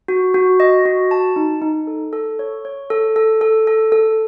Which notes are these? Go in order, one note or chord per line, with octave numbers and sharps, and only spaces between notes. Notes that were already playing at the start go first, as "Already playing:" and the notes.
F#4
F#4
D#5
F#4
A5
D#4
D#4
A4
A4
C#5
C#5
A4
A4
A4
A4
A4